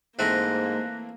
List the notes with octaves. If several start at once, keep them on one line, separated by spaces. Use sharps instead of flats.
G#2 E3 A3 A#3 C4 F#6 A#6